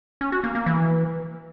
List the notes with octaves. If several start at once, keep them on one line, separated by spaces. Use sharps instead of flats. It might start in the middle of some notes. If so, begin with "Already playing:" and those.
C#4
F#4
A#3
A#3
E3